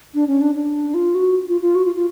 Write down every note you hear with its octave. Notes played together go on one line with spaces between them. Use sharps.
D4
C#4
D4
D4
F4
F#4
F4
F4
F#4
F4
F4